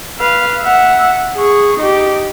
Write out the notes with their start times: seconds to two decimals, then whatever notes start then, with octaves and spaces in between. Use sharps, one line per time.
0.20 B4 F5
0.62 E5 F#5
1.37 G#4 C#6
1.79 D#4 G4